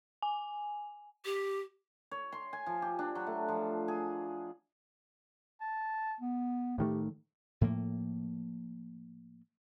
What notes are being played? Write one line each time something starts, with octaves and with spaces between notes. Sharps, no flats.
G#5
G4
C#5
C6
G#5
F3
G4
D4
F#3
A3
F3
G#4
A5
B3
A2 D#3 A3 G4
A2 F3 A3 A#3